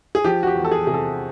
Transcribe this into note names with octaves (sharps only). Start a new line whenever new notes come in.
G#4
F3 G4
F#4
G4
E2
A4
G#4
C3 G#4
A4